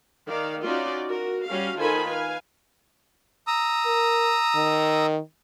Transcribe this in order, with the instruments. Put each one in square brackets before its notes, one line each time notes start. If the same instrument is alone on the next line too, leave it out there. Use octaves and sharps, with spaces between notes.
[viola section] D#3 D5 F5
C#4 D#4 F4 F#4 D5
F#4 A#4
G3 C#4 F#4 F5
D#3 F4 A4 C5 G#5 B5
B4 F5 G#5
[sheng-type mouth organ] A#5 D#6 E6
[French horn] A#4
D#3